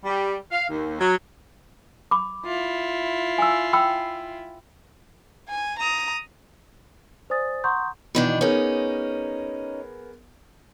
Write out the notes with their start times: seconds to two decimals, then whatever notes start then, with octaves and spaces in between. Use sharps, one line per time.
0.05 G3
0.50 F5
0.69 D#2
0.99 F#3
2.11 B5 D6
2.44 E4 F4
3.38 G#5 E6
3.73 G5 B5 E6
5.49 G#5
5.78 A#5 D#6
7.30 C5 D5 G#5 D#6 A6
7.64 F#5 A#5 C6 C#6 D#6 G6
8.15 B2 D#3 E3 D4 G6
8.41 B3 C#4 D#4 G#4 A#4